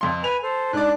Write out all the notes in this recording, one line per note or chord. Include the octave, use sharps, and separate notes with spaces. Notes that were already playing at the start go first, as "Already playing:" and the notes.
F2 C6
B4 G#5 F7
A4 C5
G#2 D4 D5 F#6